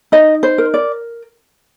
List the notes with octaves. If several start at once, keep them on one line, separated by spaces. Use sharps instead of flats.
D#4 D#5
C5
A#4
D5